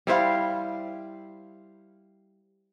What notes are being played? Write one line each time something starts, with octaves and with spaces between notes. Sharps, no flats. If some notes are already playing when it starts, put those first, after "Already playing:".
G3 E4 C5 F5